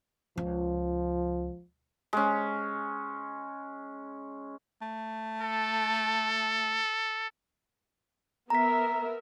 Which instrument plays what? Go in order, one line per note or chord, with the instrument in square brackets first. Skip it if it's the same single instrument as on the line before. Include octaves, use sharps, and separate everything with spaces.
[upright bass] C#2 [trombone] F3
[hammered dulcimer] G#3 C#4
[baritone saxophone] A3
[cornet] A4
[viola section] B3 A#4 E5 [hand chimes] A#5 B6